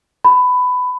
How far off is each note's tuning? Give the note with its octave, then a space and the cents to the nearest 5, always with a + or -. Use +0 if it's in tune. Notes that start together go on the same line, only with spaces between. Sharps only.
B5 +15